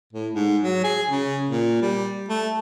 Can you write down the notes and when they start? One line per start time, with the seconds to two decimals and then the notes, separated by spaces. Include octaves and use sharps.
0.13 A2
0.33 G#2
0.63 F#3
0.84 G#4
1.10 C#3
1.49 A#2
1.82 G3
2.29 A3